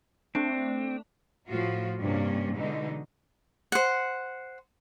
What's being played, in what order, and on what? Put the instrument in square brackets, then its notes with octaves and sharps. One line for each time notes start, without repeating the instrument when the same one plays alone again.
[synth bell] A3 D4 [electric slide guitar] C4
[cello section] A2 F3 F4 F#4
G2 C3 A#3 C#4 D4
B2 D3 E3 G#3 D#4
[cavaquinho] C5 F#5